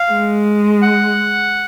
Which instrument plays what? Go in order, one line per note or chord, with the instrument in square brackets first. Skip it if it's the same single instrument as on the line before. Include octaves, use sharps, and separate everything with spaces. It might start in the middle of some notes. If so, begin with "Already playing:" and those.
Already playing: [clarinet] F5
[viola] G#3
[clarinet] F#5